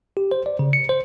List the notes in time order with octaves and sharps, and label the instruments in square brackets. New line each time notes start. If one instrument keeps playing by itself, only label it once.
[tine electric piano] G4
C5
D5
C#3
C#7
C5